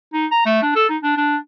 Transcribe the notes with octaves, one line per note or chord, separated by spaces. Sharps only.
D#4
A#5
A3
D4
A4
D#4
D4
D4